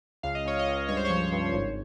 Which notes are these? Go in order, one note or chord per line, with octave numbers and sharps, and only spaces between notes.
C#2 F5
D#5
C#2 C#5
D#5
C#2
G2 C#5
C5
C#5
F3
G2
G#1